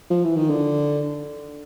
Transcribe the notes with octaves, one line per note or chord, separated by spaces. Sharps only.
F3
E3
D#3
D3